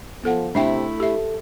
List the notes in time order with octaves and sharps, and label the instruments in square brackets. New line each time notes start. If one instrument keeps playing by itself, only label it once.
[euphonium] F3 [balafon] B3 A4 F#5
[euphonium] C3 [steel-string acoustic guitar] A3 E4 [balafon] D4 E5 G5
[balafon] G4 E5 [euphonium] A4